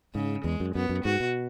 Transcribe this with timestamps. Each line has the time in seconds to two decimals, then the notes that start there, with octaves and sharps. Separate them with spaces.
0.14 G#2 C#3
0.44 E2 G#3
0.60 F#2
0.75 F#2 B3
0.89 F#2
1.05 G#2 F#4
1.20 B2